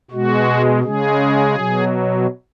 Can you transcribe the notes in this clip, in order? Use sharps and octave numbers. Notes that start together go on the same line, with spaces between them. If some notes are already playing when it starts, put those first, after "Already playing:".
B2 G#3 F#4
C#3 G#3 G#4
B2 F#3